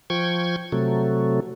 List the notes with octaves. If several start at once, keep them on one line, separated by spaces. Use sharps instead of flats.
F3 G5 C#6 G#6
C3 F#3 A3